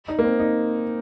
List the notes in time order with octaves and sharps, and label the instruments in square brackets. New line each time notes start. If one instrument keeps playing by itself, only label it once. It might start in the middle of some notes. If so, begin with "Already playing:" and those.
[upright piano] D#4
A#3
C4
D#4